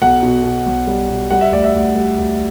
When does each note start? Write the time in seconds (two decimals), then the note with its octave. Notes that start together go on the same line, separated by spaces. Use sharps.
0.02 B1 F#5
0.23 B2
0.44 B2
0.66 B1
0.87 G3
1.09 B2
1.30 G3 F#5
1.41 E5
1.52 D2 D5
1.64 E5
1.74 D2
1.95 G3
2.18 D2